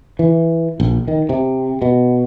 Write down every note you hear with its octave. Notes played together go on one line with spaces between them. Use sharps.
E3
A#1
D#3
C3
B2